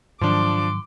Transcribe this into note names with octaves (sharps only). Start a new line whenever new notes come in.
G#2 D#3 F3 F#3 D4 C6 D6